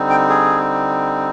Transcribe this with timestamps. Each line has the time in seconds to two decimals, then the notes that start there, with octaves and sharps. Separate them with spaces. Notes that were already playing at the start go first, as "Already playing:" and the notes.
Already playing: D3 G3 C4 D#4
0.10 G5
0.29 G#4